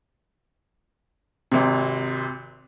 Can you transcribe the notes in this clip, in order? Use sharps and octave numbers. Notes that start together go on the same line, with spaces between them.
G#1 C3